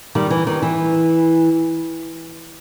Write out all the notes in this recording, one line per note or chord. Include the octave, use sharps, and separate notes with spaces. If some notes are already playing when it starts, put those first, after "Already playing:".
D#3 G3
E3
D#3
E3